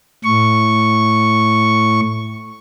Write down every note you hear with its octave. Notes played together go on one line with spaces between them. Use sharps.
A2 C#6